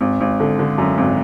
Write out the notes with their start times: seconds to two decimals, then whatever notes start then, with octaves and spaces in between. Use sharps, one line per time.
0.01 G#1
0.21 G#1
0.40 D3
0.59 D3
0.78 F#2
0.98 G#1